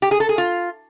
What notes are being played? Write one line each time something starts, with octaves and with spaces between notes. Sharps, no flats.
G4
G#4
A4
G#4
F4